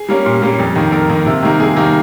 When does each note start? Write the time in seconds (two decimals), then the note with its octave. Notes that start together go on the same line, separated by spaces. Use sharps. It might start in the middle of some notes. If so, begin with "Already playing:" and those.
Already playing: G#4
0.09 G3 A#3 C#4
0.26 A#2
0.42 G3 A#3 C#4
0.59 F2
0.76 D#3 A#3
0.92 F2 A#4
1.10 D#3 A#3
1.26 C3
1.43 D#3 G3 A#3
1.60 C3 G#4
1.76 D#3 G3 A#3